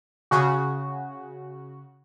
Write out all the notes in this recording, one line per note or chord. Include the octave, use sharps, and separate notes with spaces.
C#3 F#4